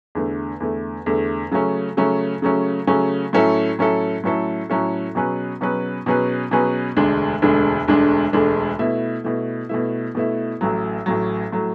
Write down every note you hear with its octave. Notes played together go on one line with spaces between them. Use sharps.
E2 D3 A3
E2 D3 A3
E2 D3 A3
C#3 F#3 A3 C#4
C#3 F#3 A3 C#4
C#3 F#3 A3 C#4
C#3 F#3 A3 C#4
A2 F#3 C#4 E4 A4
A2 F#3 C#4 E4 A4
A2 F#3 C#4 E4 A4
A2 F#3 C#4 E4 A4
B2 F#3 C#4 G#4 B4
B2 F#3 C#4 G#4 B4
B2 F#3 C#4 G#4 B4
B2 F#3 C#4 G#4 B4
E1 D2 D3 G#3 D4
E1 D2 D3 G#3 D4
E1 D2 D3 G#3 D4
E1 D2 D3 G#3 D4
B2 A3 E4
B2 A3 E4
B2 A3 E4
B2 A3 E4
A1 A2 F#3
A1 A2 F#3
A2 F#3